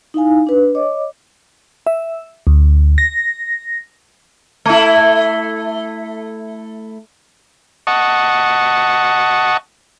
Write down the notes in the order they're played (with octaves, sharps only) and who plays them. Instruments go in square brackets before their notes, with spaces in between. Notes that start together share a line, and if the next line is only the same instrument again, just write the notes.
[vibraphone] D#4 E4 F5 G#5
D4 B4
C#5 D#5 D6
[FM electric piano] E5
D2
A#6
[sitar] A3 E4
[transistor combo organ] D#5 F#5 A5 C#6